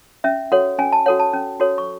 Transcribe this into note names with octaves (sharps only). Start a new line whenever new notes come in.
C#4 E5
F#4 A4 C#5 F#5
C#4 G#5
A5
F#4 A4 C#5 F#5
A5
C#4
F#4 A4 C#5
C#6